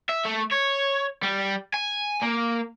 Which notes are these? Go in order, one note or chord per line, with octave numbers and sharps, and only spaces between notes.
E5
A3
C#5
G3
G#5
A#3